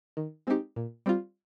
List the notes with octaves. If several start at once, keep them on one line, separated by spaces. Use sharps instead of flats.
D#3
G#3 C4 D#4 G4
A#2
G3 C4 F4